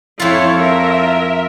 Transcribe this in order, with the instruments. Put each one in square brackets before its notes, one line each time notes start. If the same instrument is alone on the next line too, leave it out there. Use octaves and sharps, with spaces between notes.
[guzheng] F2 F4 [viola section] E4 C#5
[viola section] A#4 E5